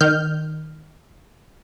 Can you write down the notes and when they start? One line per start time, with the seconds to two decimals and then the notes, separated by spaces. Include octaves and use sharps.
0.01 D#3 F6 G6